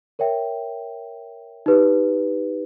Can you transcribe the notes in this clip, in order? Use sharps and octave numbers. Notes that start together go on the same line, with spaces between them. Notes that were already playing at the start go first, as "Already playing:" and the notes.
A#4 C#5 E5 G5
D#4 G4 B4